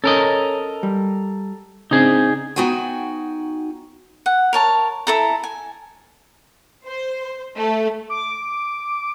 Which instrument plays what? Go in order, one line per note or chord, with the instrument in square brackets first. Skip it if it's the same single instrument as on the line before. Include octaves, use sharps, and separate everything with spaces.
[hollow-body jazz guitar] C#4 [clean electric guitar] A4 A#4 D#5
[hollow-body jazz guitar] G3
[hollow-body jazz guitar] C#3 C4 D4 [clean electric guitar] D#4 G#4
[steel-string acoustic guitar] B3 D#4 F#4 G5 G#5
[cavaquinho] F#5
A#4 C#5 A5
E4 A4 A#5
G#5
[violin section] C5
A3
[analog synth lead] D6